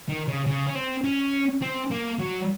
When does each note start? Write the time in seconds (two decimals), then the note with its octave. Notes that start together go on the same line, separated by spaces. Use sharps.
0.09 D#3
0.28 C#3
0.46 C#3
0.67 C#4
0.75 C4
1.04 C#4
1.61 C4
1.90 A#3
2.19 F#3